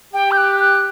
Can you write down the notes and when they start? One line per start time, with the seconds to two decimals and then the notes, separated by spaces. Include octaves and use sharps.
0.14 G4 G5
0.32 G6
0.37 F#6
0.60 F#6